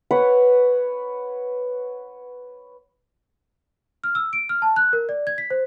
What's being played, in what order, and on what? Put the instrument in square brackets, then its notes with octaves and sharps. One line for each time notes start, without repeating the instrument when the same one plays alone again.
[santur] B4 C#5 F#5
[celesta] F6
E6
D7
F6
A5
F#6
A#4
D5
G#6
B6
C5